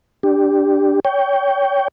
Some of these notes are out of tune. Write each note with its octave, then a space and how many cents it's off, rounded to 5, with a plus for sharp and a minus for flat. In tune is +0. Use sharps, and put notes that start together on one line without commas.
D4 +0 G4 +0
C#5 +25 G5 +0